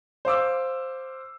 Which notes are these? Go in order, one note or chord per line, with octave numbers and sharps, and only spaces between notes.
C5 F5 D6 E6